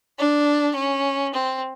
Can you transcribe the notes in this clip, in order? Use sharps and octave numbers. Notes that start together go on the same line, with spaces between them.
D4
C#4
C4